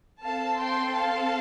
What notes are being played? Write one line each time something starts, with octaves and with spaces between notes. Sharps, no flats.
C4 A4 F5 A5
G5 C6
F5 A5